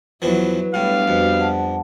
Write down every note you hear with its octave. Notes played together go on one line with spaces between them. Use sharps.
E2 F3 F#3 E4 B4
A2 G3 B3 D4 F5
F2 F#4 B4
F#5 A5